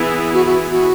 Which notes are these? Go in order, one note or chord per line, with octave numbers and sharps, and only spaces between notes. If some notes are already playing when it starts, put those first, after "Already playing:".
Already playing: E3 B3 E4 G#4
F#4
F#4
F#4